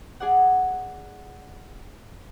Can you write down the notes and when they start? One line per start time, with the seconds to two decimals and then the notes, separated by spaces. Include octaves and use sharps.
0.20 G#4 D5 F#5